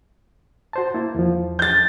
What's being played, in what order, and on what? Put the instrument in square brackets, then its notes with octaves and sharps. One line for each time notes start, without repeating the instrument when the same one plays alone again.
[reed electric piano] F#4 C5 A5
A#3 E4
E2 F3
[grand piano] G6 A6